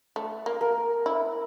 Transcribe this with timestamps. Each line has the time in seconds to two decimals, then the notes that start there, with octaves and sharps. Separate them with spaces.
0.16 A3
0.46 A#3
0.61 A#4
1.06 E4